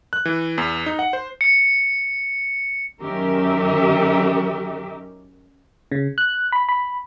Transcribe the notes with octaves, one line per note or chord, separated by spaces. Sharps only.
F#6
E3
E2
D#4
F#5
C5
C#7
F#2 D#3 C#4 G4 A#4 E5
C#3
F#6
B5
B5